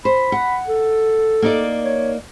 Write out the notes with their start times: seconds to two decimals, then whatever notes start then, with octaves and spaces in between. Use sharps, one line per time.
0.05 C5 B5
0.32 F#5
0.68 A4
1.42 A#3 D#4 D5
1.84 C#5